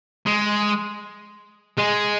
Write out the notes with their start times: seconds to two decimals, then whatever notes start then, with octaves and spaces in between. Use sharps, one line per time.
0.26 G#3
1.78 G#3